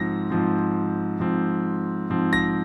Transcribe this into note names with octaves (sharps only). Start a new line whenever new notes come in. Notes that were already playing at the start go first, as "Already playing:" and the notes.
Already playing: G#2 F3 C4 A#6
G#2 F3 C4
G#2 F3 C4
G#2 F3 C4
A#6